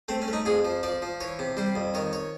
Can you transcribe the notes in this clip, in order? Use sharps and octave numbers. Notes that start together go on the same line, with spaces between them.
A3 C4
C#4
A3
D#4
F2 G#4
F3
F3 D5
F3
E3 C#5
C3
G3 C5
F2
D#3 C#5
C#5